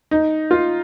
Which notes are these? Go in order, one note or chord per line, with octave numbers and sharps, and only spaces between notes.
D#4
F4